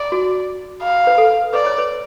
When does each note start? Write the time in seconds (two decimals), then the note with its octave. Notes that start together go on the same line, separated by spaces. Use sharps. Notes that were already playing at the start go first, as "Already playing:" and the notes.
Already playing: D5
0.12 F#4
0.82 F5
1.07 B4
1.18 A4
1.54 B4 D5
1.66 C#5
1.78 B4